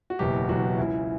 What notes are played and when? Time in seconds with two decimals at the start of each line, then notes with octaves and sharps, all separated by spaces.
0.10 F#4
0.19 F#1 E2 B2 F#3 G4
0.49 F#1 E2 B2 F#3 F#4
0.78 C#2 C#3 E3 E4